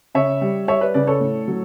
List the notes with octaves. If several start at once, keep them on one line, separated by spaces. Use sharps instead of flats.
C#3 C#5 E5
G3
G3 C#5 E5
B4 D5
C#3 B4 D5
A4 C#5
A2
F#3